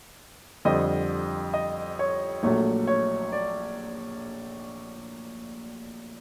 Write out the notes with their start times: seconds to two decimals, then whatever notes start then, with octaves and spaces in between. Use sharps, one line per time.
0.65 F2 D3 G3 C4 D#5
1.54 D#5
1.99 C#5
2.43 A#1 A#2 F#3 A3 C#5
2.87 C#5
3.32 D5